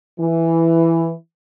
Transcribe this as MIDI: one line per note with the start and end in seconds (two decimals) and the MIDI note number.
0.20 1.12 52